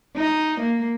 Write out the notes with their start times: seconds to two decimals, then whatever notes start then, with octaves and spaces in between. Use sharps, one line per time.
0.16 D#4
0.60 A#3